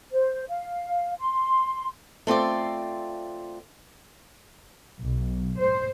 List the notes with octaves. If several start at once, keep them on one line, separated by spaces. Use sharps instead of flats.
C5
F5
C6
A3 C4 F4 D5
B1
C5